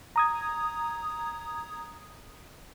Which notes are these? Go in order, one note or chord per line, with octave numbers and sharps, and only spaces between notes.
A#5 D#6 G#6